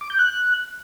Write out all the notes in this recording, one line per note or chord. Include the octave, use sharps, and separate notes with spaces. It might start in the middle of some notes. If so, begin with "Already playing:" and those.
D6
G6
F#6